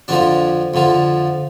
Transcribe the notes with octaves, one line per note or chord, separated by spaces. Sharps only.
F2 D3 F3 D4
F2 D3 F3